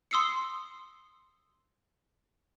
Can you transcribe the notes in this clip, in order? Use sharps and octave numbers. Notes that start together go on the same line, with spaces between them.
C6 D#6 E6 C7 C#7